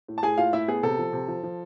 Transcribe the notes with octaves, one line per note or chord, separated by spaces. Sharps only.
A2
A5
A2 G#4 G#5
A2 F4 F5
A2 E4 E5
B3 G#4
C3 A4
F3
C3
F3
F3